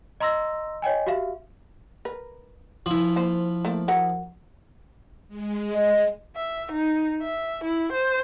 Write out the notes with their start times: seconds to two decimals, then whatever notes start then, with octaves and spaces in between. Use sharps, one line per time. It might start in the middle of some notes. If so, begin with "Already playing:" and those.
0.20 D#5 A#5 C6 E6 A#6
0.82 C#5 D#5 G5 G#5
1.06 F#4 G4 E5 F5
2.05 A#4 B4
2.86 F3 E4
3.16 A#3 C5
3.65 A3 A#3
3.88 F#4 A#4 F#5
5.28 G#3
5.75 D#5
6.36 E5
6.72 D#4
7.22 E5
7.64 E4
7.93 C5